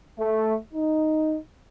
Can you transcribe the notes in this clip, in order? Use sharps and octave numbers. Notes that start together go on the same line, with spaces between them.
A3
D#4